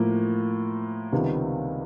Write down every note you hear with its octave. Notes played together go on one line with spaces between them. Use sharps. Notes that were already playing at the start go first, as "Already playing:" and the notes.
Already playing: A2 F3 A#3
C#2 C3 D#3 G3 B3